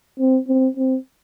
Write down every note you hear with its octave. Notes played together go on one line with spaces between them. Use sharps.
C4
C4
C4